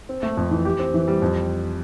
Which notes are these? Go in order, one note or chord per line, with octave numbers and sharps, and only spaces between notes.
C4
A3
F2
E3
G4
C4
E3
G3
F2